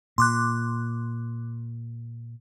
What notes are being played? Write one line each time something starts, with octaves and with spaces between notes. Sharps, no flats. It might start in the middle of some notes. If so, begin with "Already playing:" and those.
A#2 C6 D6 F#6